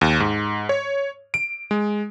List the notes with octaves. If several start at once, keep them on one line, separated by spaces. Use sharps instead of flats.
D#2
G#2
C#5
D7
G#3